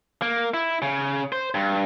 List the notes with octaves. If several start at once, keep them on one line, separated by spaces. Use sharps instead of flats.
A#3
E4
C#3
C5
G2